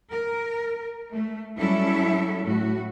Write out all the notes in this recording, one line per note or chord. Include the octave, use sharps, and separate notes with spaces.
A#4
A3
F#3 G3 C#4 E4 A4 E5
A2 F#4